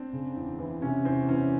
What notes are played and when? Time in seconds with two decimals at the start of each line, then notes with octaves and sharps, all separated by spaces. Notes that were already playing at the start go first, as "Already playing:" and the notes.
Already playing: C4 D4
0.13 C#3
0.36 E2
0.59 E3
0.82 C3 C#4
1.05 E2 C4
1.29 E3 C#4